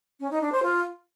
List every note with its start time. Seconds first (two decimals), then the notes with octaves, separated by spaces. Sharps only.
0.20 C#4
0.31 D#4
0.41 D4
0.52 C5
0.63 F4